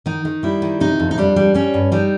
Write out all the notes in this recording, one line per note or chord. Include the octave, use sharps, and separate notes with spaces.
D#3 D#4
D#3
G3 E4
D#3
C3 D#4
F2
D#4
G3 D4
G3
G3 C#4
G2
G3 D#4